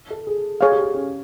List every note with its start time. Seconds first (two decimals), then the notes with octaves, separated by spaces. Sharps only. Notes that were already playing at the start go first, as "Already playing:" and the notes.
0.10 A4
0.27 G#4
0.61 G#4 C#5 F5
0.72 G4
0.83 G4
0.95 C#4